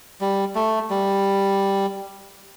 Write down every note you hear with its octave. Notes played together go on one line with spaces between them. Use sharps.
G3
A3
G3